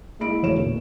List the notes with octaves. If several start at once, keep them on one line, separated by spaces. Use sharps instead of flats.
G#3 A#3 E4 D#5 B5 D7
E1 E3 G#3 A3 C#5 E7
A#2 D3